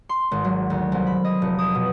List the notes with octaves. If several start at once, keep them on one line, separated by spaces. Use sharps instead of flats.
C6
G#1
F#3
D2
C2
B5
D#5
F1
D#6
B2